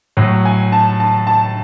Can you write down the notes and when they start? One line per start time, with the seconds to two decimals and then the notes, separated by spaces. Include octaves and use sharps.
0.17 A2 F#3
0.45 G#5
0.72 A5
1.00 A5
1.27 A5